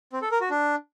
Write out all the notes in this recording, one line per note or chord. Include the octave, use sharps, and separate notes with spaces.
C4
A4
A#4
F#4
D4